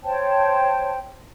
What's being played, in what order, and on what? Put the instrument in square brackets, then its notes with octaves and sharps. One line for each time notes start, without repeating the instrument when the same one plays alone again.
[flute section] C5 C#5 G5 A5